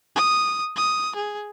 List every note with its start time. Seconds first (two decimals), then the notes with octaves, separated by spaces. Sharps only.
0.16 D#6
0.76 D#6
1.15 G#4